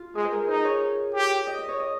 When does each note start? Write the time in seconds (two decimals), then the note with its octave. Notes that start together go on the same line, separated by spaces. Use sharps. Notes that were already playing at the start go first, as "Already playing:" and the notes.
Already playing: F4
0.15 G#3 G#4
0.25 C5
0.32 A#4
0.48 D#4 C5
0.65 C#5
1.14 G4
1.47 D#5
1.58 D#5
1.69 C#5
1.80 D#5